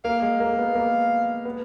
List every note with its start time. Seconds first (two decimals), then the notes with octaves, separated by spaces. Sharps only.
0.04 A#3 F5
0.22 G#3
0.40 A#3
0.53 A#3
0.58 B3
0.75 A#3
1.45 B3